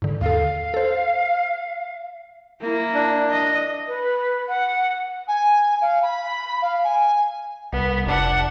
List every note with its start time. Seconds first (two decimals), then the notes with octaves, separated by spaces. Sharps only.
0.02 G#2 D3
0.21 D#2 A4 F5
0.74 A4 C5
2.61 A#3 E4
2.94 D4
3.30 D#5
3.88 B4
4.49 F#5
5.27 G#5
5.81 F5
6.02 B5
6.62 F5
6.84 G#5
7.73 C2 B3
8.06 F1 D4 F#5